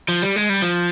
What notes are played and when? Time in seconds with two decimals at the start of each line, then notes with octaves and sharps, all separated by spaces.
0.08 F3
0.22 G3
0.36 G#3
0.49 G3
0.62 F3